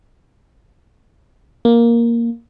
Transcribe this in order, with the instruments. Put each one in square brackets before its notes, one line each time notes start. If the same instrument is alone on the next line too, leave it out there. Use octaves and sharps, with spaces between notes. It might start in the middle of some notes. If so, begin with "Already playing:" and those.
[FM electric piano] A#3